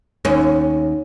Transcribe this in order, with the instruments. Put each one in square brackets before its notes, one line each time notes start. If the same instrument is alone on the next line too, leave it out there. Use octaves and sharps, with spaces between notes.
[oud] D#2 C#4